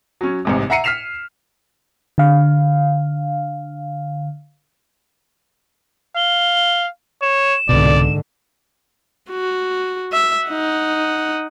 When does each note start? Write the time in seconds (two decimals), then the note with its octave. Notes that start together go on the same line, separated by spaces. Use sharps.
0.21 F#3 C#4
0.45 A1 G#2 C3
0.70 E5 F#5 A#5 C7 C#7 D#7
0.84 F6 B6 C7 E7 F7
2.18 D3 F5
6.16 F5 G7
7.22 C#5 E7
7.69 C2 G#2 B2 D3 D5
9.30 F#4
10.13 E5
10.47 D#4 F#5